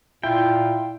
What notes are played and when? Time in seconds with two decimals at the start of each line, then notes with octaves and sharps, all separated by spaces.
0.23 A#2 E4 F4 G5